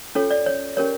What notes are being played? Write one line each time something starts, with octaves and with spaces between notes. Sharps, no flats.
C#4 F4 A4 C#5
D5
C#5
C#4 G4 A#4 C#5